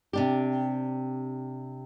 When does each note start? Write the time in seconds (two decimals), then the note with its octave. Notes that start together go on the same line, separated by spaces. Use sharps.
0.13 C3 D4 G4